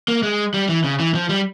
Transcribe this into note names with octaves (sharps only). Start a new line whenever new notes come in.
A#3
G#3
G3
E3
C#3
E3
F3
G3